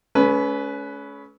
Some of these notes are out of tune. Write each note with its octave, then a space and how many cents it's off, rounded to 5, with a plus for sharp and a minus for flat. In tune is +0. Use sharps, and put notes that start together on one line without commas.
A3 -45 C#4 +25 B4 +0